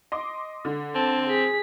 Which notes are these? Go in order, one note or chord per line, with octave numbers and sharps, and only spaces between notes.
D#5 C6 D6
D3
C4 A5
G#4 B6